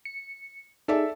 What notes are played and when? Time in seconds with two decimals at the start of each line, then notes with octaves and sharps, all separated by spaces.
0.05 C#7
0.88 D#4 G#4 A4 D5 E5